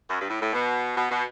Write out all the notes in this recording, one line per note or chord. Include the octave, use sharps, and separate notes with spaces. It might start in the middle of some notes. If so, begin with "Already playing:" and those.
F#2
G2
A2
A2
B2
B2
B2